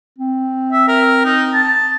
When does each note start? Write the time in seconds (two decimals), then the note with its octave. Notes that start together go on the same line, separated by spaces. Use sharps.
0.18 C4
0.73 E5
0.88 A#4
1.25 D#4
1.54 A5